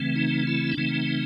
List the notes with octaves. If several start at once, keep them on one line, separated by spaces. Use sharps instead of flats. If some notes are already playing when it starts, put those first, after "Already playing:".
Already playing: C#3 E3 A3 C4
D#4
E4
D4
C#3 E3 A3 C4 D#4